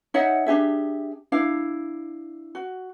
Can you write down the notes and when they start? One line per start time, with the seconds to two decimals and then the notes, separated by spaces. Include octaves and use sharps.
0.14 D#4 C#5 E5 F#5
0.46 D4 G4 G#4 E5
1.32 D4 E4 F5
2.55 F#4